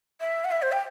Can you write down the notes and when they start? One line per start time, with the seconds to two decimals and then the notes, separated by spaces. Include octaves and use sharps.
0.21 E5
0.45 F#5
0.51 E5
0.62 C5
0.72 G5